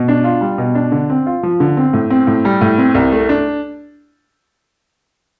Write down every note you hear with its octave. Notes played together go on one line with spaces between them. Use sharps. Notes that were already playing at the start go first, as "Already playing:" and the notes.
Already playing: B2
D4
F4
G3
B2
D4
D3
C4
F4
F3
D3
C4
A2
C4
A2
G3
A2
C4
C2
A3
D4